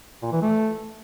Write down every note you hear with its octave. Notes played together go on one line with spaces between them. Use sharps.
A#2
E3
A3